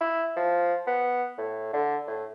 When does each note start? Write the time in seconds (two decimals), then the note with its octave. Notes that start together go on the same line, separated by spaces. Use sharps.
0.01 E4
0.36 F3
0.87 B3
1.38 A2
1.73 D3
2.08 A2